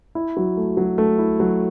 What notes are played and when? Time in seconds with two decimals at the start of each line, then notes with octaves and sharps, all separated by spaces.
0.15 E4
0.37 F#3
0.57 A3
0.77 F#3
0.98 A3
1.19 E4
1.40 F#3